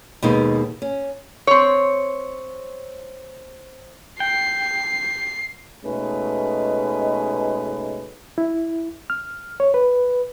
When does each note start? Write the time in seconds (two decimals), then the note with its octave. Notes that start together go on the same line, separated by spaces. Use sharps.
0.22 D#2 B2 G#3 D#4
0.82 C#4
1.47 C4 C#5
4.20 G5 C7
5.84 B2 G#3 A3 C#4 D#4 B4
8.38 E4
9.10 F6
9.60 C#5
9.74 B4